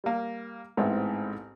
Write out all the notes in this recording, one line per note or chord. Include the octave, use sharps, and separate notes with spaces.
G3 A#3
A1 G#2 B3 C4 E4